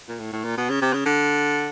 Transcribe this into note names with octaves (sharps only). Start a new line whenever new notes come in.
A#2
A2
A2
A#2
B2
C#3
C3
C#3
D3